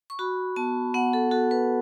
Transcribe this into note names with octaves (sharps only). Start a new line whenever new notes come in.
C#6
F#4 B5
B3 A5
B3 F#5
A4
F#4 A4
B4